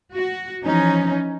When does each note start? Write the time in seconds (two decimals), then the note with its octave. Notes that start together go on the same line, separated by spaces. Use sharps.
0.12 F#4
0.62 E3 F3 C#4 D#4